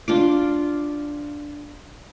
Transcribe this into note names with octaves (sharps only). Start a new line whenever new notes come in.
D4 F4 D6